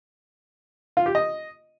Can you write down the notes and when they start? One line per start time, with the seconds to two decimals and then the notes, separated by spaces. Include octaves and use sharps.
0.97 F4
1.06 G4
1.15 D#5